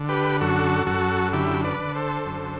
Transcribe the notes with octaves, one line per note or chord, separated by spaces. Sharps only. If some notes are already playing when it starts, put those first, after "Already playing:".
Already playing: D3
G4 B4
F#2 F#4 A4
F#2 F#4 A4
D3 E4 G4
B4 D5
D3
A4 C5
F#2